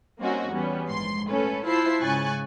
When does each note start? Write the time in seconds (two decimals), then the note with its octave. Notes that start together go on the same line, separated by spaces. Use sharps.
0.19 G3 A#3 C4 C#4 D#4 F#4
0.51 E2 G3 B3 C#4
0.89 A#1 G#2 C6
1.28 A3 C#4 A4 B4
1.65 E4 F4 C5 A5 C7
2.01 G#2 C#3 G#5 C#6 F#6 A6